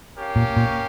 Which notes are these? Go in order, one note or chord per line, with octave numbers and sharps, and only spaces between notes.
C#4 G4 A#4 F5
A#2
A#2